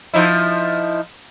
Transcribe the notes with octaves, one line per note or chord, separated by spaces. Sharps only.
F3 D#4 E4